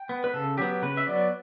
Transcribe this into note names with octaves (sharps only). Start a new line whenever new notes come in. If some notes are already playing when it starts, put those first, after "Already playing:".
Already playing: G5
B3
B4
C#3 A4
F#3 B3 G4
C#3 B4
E5
F#3 B3 D5